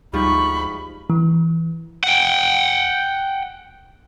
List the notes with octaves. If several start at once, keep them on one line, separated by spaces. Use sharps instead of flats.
D2 G#2 F3 G3 D#4 B5 C#6
E3
F#5 G5